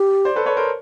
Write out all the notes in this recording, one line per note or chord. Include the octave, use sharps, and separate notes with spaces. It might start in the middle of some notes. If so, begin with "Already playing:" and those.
Already playing: G4
C5 D5
A4 B4
B4 C#5
A#4 C5